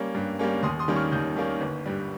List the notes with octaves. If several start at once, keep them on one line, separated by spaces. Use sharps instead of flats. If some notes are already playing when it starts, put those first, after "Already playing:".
Already playing: G3 A#3 C#4
G2
G3 A#3 C#4
D#2 C6 D#6
C6 D#6
D#3 G3 A#3 C#4
C#6 F6
D#2 D#6 G6
D#3 G3 A#3 C#4
G1
G2 G3